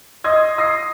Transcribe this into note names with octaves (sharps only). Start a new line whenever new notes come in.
D#5 C6 D#6 G#6
D#6 A#6 C7